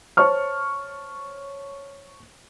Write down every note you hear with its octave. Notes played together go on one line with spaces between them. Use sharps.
C5 C#5 A5 C#6 F6